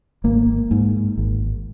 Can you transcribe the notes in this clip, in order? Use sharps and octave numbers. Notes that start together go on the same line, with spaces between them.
G#1 A#3
G#2
G#1